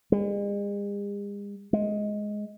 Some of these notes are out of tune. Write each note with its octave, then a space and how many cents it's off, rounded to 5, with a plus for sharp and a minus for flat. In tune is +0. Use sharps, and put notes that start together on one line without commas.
G#3 -45
G#3 +10